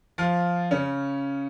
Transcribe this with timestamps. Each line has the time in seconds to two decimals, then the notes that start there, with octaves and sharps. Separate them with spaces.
0.18 F3 F4
0.71 C#3 C#4